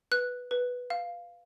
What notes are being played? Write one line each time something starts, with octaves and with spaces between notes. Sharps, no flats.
B4 F#6
B4
F5